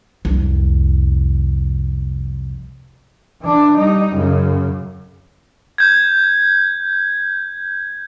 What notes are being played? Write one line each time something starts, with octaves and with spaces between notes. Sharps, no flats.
C2 F2
E3 D4
G3 D#4
F#2 C#3
G6 G#6